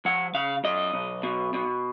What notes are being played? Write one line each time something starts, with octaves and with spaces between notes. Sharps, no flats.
F3 F#5
C#3 F5
F#2 D#5
B1
B2
B2